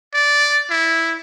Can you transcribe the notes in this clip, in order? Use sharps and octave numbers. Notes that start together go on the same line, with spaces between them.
D5
E4